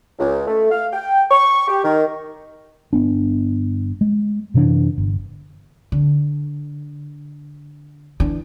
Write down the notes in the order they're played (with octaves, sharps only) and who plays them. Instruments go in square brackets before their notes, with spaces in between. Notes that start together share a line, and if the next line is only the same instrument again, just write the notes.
[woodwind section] C#2
A3
F5
G5
C#6
G4
D#3
[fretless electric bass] G1 B3 D4
G#3
F#2 C3 E3 D4
G1
[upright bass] D3
E3 D4